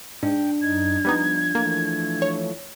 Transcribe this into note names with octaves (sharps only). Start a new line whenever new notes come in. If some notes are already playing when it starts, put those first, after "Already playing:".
G#2 D4 G5
F#2 D#4 G#6
F3 G3 B3 D#4
E3 F3 A3 A#3
C#5